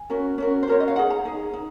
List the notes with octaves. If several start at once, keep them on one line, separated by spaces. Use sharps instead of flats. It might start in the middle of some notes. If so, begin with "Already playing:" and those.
Already playing: G#5
C#4 F#4 A#4
C#4 F#4 A#4
C5
C#4 F#4 A#4 C#5
D#5
F5
D#4 G#4 F#5
A#5
D#4 G#4
D#4